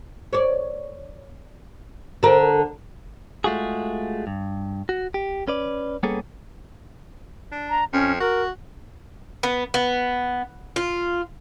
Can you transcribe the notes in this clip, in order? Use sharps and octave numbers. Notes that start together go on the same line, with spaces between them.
C#5 D5
D3 A#4
G#3 A3 F4 F#4 G#4
G2
F#4
G4
C#4 B4 D5
G3 A#3 B3 C#4 G#4 A4
D4
A#5
F2 C#4
F#4 A#4
B3
B3
F4